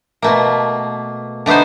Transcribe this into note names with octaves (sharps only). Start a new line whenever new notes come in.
B2 A3 A#3
D3 A3 B3 D#4 C5